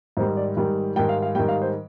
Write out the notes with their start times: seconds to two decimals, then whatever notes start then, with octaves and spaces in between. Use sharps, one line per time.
0.17 G#2 D#3 G3 C5
0.37 D5
0.57 G#2 D#3 G3
0.96 G#2 D#3 G3 G5
1.09 F5
1.22 F5
1.35 G#2 D#3 G3 G5
1.48 F5
1.62 C5